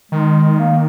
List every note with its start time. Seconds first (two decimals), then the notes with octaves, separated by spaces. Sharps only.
0.12 D#3 G#3
0.59 A#3